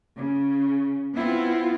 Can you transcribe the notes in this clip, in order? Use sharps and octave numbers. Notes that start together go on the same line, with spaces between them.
C#3
B3 C4 E4 F4